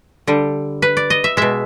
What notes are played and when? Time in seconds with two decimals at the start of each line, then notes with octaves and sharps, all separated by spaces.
0.27 D3 G3
0.82 B4
0.97 D5
1.10 D#5
1.24 E5
1.37 B2 G#3 E5